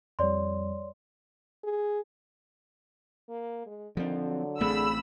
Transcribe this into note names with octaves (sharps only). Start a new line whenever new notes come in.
F2 G3 C#5 D5 C6
G#4
A#3
G#3
D3 D#3 F3 C4
F#3
A1 A3 C4 G#4 B5 E6